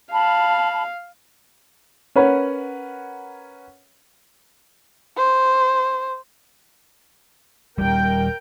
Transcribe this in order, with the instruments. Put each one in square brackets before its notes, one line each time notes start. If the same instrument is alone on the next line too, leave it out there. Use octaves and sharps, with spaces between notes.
[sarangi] F5 [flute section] A5 B5
[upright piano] C#4 A#4 B4 C#5 F#5
[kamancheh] C5
[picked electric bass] D#1 C#2 G3 [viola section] A#4 G5